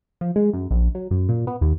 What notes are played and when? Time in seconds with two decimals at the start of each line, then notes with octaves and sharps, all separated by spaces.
0.21 F3
0.36 G#3
0.53 F#2
0.71 A#1
0.95 F#3
1.11 F#2
1.29 A#2
1.47 B3
1.61 D#2